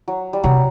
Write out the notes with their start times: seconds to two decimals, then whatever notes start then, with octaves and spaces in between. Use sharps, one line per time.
0.08 F#3
0.33 G3
0.43 C3 F#3